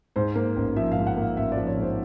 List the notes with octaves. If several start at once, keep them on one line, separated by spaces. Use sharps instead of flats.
G#2 C5
A#3
A1
F3 E5
G#2 F5
F#5
A#3 F5
A1 E5
D5
F3
C#5
G#2
C5